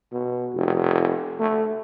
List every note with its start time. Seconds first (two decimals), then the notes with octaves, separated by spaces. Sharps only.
0.12 B2
0.53 F1
1.40 A3